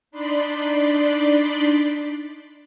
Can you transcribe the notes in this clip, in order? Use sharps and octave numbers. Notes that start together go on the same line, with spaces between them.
D4 D#4 D5 B5 C6